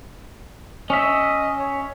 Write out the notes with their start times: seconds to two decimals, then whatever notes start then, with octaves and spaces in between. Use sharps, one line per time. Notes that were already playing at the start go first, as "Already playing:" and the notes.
0.90 C#4 D#5 E5
1.59 C#5